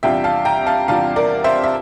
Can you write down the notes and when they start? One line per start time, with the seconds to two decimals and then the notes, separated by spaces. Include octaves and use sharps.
0.03 E2 C3 G3 D4 F4 E5 G5
0.24 F5 A5
0.45 G5 A#5
0.66 F5 A5
0.88 E2 C3 G3 D4 F4 F5 A5
1.16 A#4 D5
1.44 C5 E5
1.64 E5